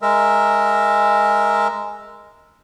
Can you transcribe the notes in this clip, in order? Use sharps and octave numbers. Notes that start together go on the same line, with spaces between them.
G#3 A#4 E5